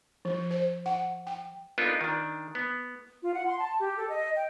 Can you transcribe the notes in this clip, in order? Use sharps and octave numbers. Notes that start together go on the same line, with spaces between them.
F3
C5
F#5
G5
B3 D4 D#4 F4 A4 A#4
D#3 D4
B3
F4
F#5
C6
A5
G4
A4
D#5
G5